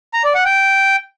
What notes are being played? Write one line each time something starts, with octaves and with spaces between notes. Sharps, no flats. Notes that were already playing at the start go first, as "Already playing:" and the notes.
A#5
D5
F#5
G5